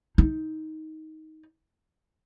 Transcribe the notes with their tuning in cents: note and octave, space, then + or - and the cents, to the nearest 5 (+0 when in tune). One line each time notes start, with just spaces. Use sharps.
D#4 +15